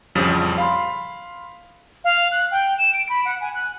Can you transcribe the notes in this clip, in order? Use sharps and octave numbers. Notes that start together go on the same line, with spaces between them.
A1 F2 C#3 F3 G3
F5 B5 C6
F5
F#6
G5
E7
D7
B5
F#5
G#5
F#6